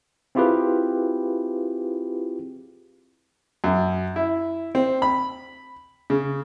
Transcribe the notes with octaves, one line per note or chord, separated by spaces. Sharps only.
C4 E4 F4 G4 G#4 B4
F#2
E4
C4
B5
C#3